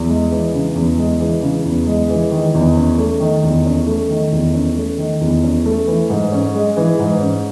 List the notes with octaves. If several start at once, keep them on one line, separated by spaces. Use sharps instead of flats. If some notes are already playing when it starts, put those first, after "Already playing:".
Already playing: E2
G#3
E3
C#3
E2
G#3
E3
C#3
E2
G#3
E3
D#3
E2
C#4
A3
D#3
E2
C#4
A3
D#3
E2
C#4
A3
D#3
E2
C#4
A3
E3
G#2
C#4
G#3
E3
G#2
C#4